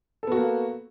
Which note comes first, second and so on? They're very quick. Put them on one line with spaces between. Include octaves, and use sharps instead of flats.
A4 B3 F#4 A#3